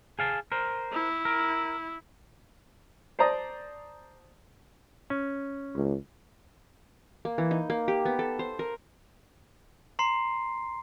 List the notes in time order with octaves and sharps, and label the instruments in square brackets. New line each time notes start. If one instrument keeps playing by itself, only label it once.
[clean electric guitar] G#4 F5 A5
A#4 C5
[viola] E4
[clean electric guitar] A#4
[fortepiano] C5 D5 A5 A#5 D#6
[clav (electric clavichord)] C#4
[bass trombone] C#2
[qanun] A#3
E3
D#4
A#3
G4
B3
A4
C5
A#4
[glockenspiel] A#5 C6 C7